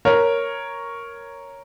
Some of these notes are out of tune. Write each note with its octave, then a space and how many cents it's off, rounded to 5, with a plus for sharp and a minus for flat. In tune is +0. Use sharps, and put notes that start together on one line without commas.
A#4 +0 C#5 +0